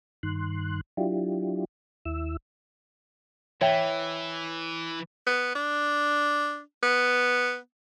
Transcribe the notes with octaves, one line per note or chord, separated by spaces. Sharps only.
G2 D#3 C6 F#6
F#3 D4 E4 F4 G4
D#2 E4 E6
E3 C#5 E5 G5
B3
D4
B3